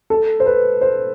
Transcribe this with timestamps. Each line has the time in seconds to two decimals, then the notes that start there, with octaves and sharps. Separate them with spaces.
0.10 A4
0.40 C5
0.46 B4
0.81 C5